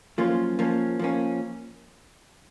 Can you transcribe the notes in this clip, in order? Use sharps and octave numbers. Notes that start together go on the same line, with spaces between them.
F#2 F3 A#3 C#4 F4
F3 A#3 C#4
F3 A#3 C#4